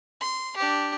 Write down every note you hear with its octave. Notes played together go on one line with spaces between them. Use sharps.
C6
D4 G4